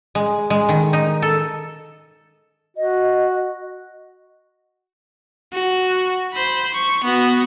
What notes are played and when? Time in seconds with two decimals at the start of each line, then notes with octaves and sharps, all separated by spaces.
0.15 G#3
0.50 G#3
0.69 D#3
0.93 D#4
1.22 A4
2.77 F#4 D#5
5.53 F#4
6.33 C5 B5
6.73 C#6
7.04 B3 F#4